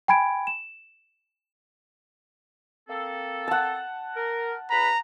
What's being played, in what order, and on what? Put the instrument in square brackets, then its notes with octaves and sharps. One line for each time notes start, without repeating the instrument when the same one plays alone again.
[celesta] G5 G#5 B5 G#6 D7
E7
[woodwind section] A#3 C4 A4
[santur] F#5 A5
[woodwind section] A#4
[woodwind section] E2 B4 B5 [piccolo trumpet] A#5